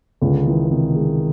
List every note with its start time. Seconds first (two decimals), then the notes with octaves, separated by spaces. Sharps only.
0.22 C#2 D3
0.46 D#3 E3
0.71 C3 D#3
0.95 G#3